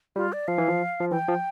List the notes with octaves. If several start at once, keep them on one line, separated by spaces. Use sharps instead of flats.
G3 F4
D5
F3 F5
E3
F3
F3
E3 G5
F3